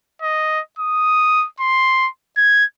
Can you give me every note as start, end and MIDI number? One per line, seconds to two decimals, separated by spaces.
0.22 0.60 75
0.79 1.47 87
1.60 2.08 84
2.37 2.65 92